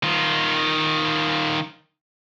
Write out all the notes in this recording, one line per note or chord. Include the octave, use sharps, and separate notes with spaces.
D#3 F4